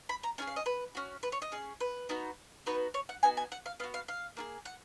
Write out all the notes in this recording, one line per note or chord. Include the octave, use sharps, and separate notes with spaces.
B5
A#5
C#4 F4 G#4 G#5
F5
D#5
B4
C#4 F#4
B4
C#5
D#5
C#4 G#4
B4
B3 D#4 F#4
B3 D#4 F#4 B4
C#5
F#5
B3 D#4 F#4 G#5
G#5
F#5
F5
B3 F#4 F5
F5
F5
A#3 F4 G#4
F#5